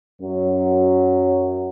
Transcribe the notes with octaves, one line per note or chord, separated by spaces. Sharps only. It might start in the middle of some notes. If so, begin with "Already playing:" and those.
F#2 F#3